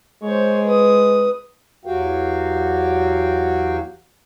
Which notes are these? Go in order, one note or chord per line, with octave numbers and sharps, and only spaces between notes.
G#3 C5 C#5
B4 D#6
E2 F#3 F#4 G4 F5 G5